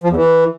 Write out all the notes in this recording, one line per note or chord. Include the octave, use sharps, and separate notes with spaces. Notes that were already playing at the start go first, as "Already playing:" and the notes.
F3
E2
E3